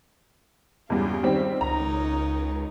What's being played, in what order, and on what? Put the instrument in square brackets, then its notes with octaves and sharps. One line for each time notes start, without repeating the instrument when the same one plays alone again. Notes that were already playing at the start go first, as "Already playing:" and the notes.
[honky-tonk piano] E2 G2 [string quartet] A#2 C#3 F4
[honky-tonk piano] D#3 G3 C4
[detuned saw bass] C#2 [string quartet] D#4 A#4 C#5 [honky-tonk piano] A#5